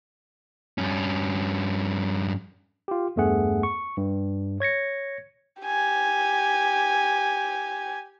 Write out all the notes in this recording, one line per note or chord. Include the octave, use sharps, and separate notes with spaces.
G2 C#4
F4 G4
E2 G2 A3 B3 G#4 F#5
C#6
G2
C#5 G#6 A#6 C#7
G4 G#5